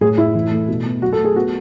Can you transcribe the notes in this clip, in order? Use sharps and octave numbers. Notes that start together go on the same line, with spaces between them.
A2 G#4
A2 E4
E3
A3
B2
B3
F#3 F#4
A4
A3
G#4
B3 F#4